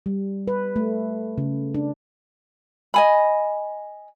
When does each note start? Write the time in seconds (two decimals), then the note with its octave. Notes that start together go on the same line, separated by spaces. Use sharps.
0.06 G3
0.48 B4
0.76 A3
1.38 C#3
1.74 D4
2.94 D#5 G#5 B5